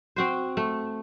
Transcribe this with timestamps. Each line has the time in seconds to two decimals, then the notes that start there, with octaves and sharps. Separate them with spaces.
0.16 C4 F#4 C5
0.57 A3